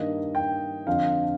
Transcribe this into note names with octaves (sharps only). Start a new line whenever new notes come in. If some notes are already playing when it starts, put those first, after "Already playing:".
Already playing: G2 D#3 A#3 D#5
G5
F2 D3 F3 C4 F4 F5